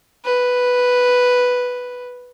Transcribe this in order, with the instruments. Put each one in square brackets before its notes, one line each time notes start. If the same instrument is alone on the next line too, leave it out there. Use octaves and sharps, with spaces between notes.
[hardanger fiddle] B4